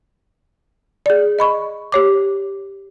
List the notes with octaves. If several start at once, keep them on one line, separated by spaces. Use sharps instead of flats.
G#4 D5
D#5 B5 C#6
G4 C#5 D6